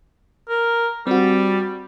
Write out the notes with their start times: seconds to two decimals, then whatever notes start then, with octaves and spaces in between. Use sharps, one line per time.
0.49 A#4
1.07 G3 C4 F#4